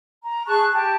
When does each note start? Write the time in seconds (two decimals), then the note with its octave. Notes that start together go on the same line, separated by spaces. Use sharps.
0.23 A#5
0.46 G#4 A5 C#6 F#6
0.72 G4 A5